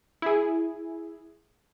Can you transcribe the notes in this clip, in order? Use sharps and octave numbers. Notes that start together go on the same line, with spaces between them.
E4 G#4